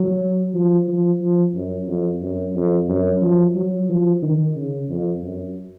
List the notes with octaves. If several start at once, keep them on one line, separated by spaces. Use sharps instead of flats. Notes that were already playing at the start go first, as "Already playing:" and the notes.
Already playing: F#3
F3
F3
F3
F#2
F2
F#2
F2
F#2
F3
F#3
F3
D#3
C#3
F2
F#2